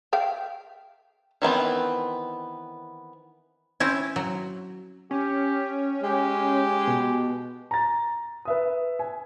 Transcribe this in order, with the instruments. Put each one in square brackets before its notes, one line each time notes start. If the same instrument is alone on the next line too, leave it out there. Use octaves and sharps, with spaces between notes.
[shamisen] E5 F5 G5
[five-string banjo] D#3 E3 B3 C4
[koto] C4 C#4 E4
F#3
[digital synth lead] C#4 [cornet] G4
[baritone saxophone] G#3 [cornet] G4
[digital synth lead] B2
[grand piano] A#5 A6
B4 E5 D#6
G#5